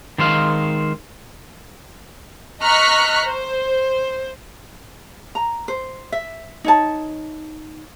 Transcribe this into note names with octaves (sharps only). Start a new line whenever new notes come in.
D#3 G#3 C5 F5
D#5 A#5 C#6 F6 F#6 B6
C5
A#5
C5
E5
D#4 C#5 A5